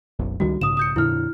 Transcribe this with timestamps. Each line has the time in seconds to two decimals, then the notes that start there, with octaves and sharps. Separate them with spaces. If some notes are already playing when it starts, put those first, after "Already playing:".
0.19 F#1 B1 F#2
0.40 C#2 D#3 G3 F#4
0.61 B1 G#2 C#3 D#6 E7
0.77 D#6 G6 C#7
0.96 F2 A#2 D3 E4 F6